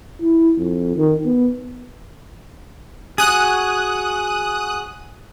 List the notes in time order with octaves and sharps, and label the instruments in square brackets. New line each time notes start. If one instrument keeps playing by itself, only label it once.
[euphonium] E4
F2
D#3
B3
[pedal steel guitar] F#4 G#4 [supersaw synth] D#6 F#6